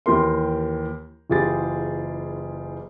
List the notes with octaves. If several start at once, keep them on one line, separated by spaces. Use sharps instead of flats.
D#2 E3 G4 A#4 C6
F#1 E3 F4 G4 G#4 A6